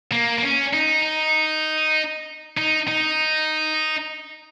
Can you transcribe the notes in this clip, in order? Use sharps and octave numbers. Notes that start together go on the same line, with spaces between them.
A#3
A#3
C#4
D#4
D#4
D#4